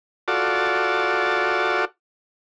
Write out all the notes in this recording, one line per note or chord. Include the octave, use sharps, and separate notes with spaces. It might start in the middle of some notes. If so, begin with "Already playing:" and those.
F4 F#4 A4 D5